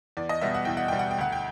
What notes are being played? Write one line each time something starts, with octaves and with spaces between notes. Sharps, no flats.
E2 D5
D#5
B2 G3 B3 E5
F#5
E2 G5
F#5
B2 G3 B3 G5
F#5
G5
D2 F#5
G5